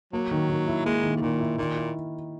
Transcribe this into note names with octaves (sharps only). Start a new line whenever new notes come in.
F#3 A#3
D#3
D#3
E4
G#3 A#3
D#3
G#2
A#2 D#3
E4
A#2 D#3
E4